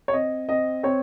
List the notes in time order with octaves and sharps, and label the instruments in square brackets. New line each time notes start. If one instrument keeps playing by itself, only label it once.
[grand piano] C#5
C4 D#5
C4 D#5
C4 C#5